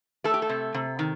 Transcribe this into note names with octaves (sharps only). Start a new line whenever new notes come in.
A3 A4
G4
A4
C3
C3
D#3